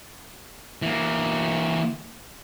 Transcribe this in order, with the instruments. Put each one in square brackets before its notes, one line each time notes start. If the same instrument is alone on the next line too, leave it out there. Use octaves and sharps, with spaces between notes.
[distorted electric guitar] E3 A#3